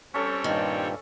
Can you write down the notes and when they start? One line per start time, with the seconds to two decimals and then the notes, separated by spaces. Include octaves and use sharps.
0.14 G3 C4 C#4 A4 C#5
0.44 G2 A#2 D#3